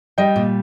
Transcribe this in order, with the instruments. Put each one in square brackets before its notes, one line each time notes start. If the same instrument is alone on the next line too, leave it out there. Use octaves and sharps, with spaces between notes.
[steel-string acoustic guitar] G3 [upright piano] D#5 G5
[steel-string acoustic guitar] A#2